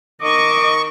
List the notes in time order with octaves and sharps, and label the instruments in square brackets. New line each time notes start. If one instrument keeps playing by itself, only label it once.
[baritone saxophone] D#3 [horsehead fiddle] D#5 [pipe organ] C#6 [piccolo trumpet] D6